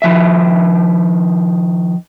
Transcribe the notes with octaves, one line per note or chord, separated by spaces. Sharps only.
D#3 F3 E5